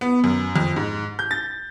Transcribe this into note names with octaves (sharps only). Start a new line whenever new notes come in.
B3
F#2
F2
G#2
G6
A6